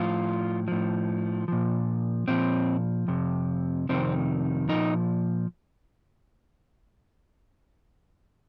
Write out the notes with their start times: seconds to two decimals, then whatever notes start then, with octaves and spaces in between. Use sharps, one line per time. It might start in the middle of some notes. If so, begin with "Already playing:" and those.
Already playing: A2 F3 F4
0.68 A2 F3
1.48 A#2 F3
2.28 A#2 F3 C4
3.08 F2 C3
3.89 F2 C3 D#3 C4
4.69 A#2 F3 D#4